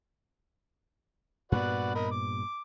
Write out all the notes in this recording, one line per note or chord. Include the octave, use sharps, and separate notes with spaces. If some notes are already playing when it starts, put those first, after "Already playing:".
G2 A#2 B3 F#4 B4 D5
A#4 D#5 B5
D6